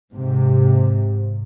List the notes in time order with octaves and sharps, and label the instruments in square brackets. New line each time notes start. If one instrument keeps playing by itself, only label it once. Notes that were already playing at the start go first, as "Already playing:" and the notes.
[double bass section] G#2 C3